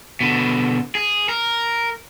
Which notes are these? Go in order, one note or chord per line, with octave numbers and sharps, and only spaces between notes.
B2 D3
G#4
A#4